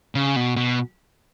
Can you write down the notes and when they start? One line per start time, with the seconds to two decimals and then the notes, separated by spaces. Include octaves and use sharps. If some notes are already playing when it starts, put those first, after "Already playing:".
0.15 C#3
0.36 B2
0.56 B2